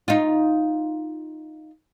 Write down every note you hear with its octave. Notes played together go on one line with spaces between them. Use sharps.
D#4 F4